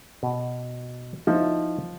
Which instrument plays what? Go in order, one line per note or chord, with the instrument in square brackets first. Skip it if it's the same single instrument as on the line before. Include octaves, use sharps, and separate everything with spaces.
[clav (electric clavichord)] B2
[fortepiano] F3 [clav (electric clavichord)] D#4 E4